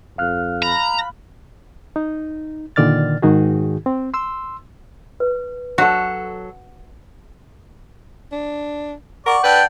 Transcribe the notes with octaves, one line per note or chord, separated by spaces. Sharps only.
F2 F5 F6 F#6
A#5 B5
D#4
A#2 D3 D#3 D5 F6 A6
G#2 D#3 D#4 F#4 G#4
C4
C6 E6
B4
F#3 F#4 A4
D4
A#4 D5 F#5 C#6
D4 A4 B4 G5